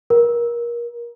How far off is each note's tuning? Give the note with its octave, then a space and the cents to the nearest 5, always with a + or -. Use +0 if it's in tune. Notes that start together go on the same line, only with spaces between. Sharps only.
A#4 +25